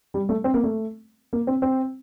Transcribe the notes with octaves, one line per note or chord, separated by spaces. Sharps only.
G3
A3
C4
A#3
A3
A#3
C4
C4